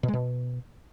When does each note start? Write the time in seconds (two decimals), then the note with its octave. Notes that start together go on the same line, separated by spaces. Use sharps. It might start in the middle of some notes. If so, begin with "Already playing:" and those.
0.03 B2
0.08 G#3
0.13 B2